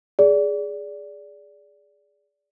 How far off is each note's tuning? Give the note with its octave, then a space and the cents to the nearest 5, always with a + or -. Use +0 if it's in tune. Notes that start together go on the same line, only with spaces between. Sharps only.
G#4 +0 D5 -15